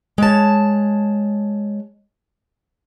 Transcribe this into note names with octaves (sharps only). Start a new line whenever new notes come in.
G#3 C#5 A5